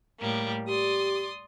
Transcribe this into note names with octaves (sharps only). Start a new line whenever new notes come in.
A2 G3 A#3
G4 D5 C6 D#6